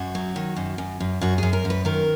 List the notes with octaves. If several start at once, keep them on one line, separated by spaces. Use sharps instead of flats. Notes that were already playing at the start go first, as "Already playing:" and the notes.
Already playing: F#2 F#4
F#3
D#3
F#2
F#2
F#2
F#2 F#4
F#2 G#4
A#4
F#2
B4
D#3 A#4